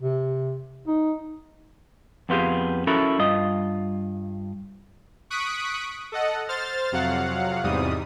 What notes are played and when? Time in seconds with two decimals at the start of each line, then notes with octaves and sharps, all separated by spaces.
0.01 C3
0.88 D#4
2.29 F2 B3 F4 G4 G#4
2.87 C#4 E4 F#4 A4 A#4
3.19 G2 F4 D#5
5.30 C#6 D#6 F#6 B6 D7
6.12 A4 D#5 F#5
6.49 C5 F6 A6
6.92 F2 C3 F#3 F5 F#5
7.64 E2 G#2 C3 G3 D#6